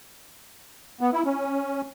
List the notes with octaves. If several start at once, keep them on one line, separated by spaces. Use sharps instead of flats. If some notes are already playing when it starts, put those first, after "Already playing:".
B3
E4
C#4